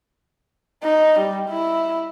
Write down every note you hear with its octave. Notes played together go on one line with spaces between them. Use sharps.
D#4
G3
E4